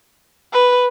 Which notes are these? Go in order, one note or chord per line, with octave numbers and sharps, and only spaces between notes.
B4